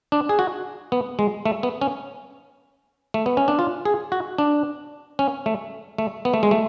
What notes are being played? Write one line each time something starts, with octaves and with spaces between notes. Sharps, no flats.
D4
G#4
F#4
B3
G#3
A3
B3
C#4
A3
B3
C#4
D4
F4
G#4
F#4
D4
C#4
A3
A3
B3
A3
G#3
A3